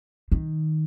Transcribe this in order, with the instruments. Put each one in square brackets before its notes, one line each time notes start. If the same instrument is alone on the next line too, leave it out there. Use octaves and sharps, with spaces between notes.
[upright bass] D#3